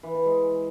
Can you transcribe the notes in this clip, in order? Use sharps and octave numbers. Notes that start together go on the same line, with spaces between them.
E3
E3
G#3